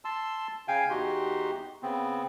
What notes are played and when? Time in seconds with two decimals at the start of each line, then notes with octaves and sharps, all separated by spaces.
0.05 A5 C6 E6
0.68 C#3 F5 G5 G#5
0.90 E2 D#4 F#4 G4 C6
1.83 C#3 B3 C4